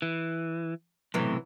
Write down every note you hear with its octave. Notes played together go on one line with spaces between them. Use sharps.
E3
B1 A2 C3 E3 F#3